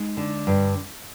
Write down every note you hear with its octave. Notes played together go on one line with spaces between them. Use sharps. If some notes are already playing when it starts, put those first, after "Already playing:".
Already playing: G#3 D#4
D3
G2